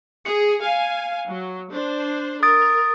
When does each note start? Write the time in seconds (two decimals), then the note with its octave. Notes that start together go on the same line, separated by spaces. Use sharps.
0.25 G#4 C#7
0.61 F5 G#5
1.27 F#3
1.71 D4 C5
2.43 A#4 D#6 A6 D7